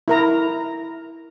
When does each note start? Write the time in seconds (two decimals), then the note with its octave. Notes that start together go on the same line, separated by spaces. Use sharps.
0.08 E4 A#4 A#5